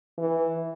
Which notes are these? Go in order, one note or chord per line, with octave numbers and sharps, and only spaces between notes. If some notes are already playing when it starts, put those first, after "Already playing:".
E3